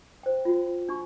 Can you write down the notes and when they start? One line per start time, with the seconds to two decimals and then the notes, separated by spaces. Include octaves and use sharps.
0.23 C5 G5
0.45 F4 F#4
0.89 D4 F#4 C#6